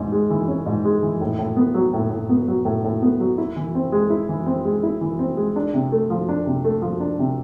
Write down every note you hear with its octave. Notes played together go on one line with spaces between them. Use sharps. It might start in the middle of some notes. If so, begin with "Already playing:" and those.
Already playing: G#2 E3 C#4
G#3
E3
C#4
G#2
G#3
E3
A2
A2
B3
F#3
A2
A2
B3
F#3
A2
A2
B3
F#3
E4
E3
C4
G#3
E4
E3
C4
G#3
E4
E3
C4
G#3
D4
C3
A3
F3
D4
C3
A3
F3
D4
C3